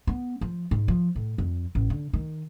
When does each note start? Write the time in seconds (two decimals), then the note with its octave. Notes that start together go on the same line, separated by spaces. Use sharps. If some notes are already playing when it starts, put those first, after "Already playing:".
0.07 B3
0.41 F3
0.71 G#2
0.88 F3
1.16 A2
1.38 F2
1.75 A1
1.90 D3
2.13 D#3